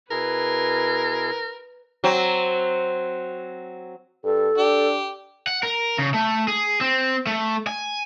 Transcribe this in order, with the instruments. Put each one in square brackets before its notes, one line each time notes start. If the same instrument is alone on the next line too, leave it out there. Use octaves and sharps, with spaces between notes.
[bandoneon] B2 E4 G#4 [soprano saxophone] A#4 [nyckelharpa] B4
[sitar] F#3 C4
[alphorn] G2 [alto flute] A4
[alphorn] D4 [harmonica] G4
[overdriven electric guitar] F#5
A#4
C#3
A3
G#4
C4
A3
G#5